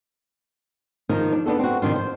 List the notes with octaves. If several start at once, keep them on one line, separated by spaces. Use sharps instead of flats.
D#3 F3 D#4 A#4
D4
B3 D4 F#4 A4
C4 F#4
F2 C3 D#3 D4 F4
C5